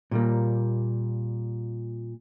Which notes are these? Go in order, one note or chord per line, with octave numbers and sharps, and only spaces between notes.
A#2 G3 A#3